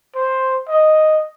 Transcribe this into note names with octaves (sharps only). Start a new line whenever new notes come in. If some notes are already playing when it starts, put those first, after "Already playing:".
C5
D#5